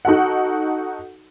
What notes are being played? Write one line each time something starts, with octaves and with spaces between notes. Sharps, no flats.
D#4 F#4 A4 F#5